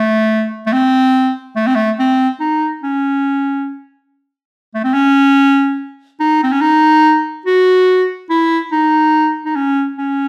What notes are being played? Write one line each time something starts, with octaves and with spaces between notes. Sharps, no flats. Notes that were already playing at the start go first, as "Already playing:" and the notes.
Already playing: A3
A3
C4
A3
C4
A3
C4
D#4
C#4
A3
C4
C#4
D#4
C4
C#4
D#4
F#4
E4
D#4
D#4
C#4
C#4